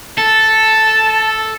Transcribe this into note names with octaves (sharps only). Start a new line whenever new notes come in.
A4 A5